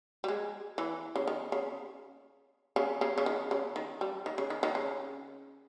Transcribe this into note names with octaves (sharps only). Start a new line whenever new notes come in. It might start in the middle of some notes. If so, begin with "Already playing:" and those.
G3
G#3
E3
C#3
D#3
C#3
C#3
C#3
C#3
D#3
C#3
D#3
G3
D#3
C#3
D#3
D#3
C#3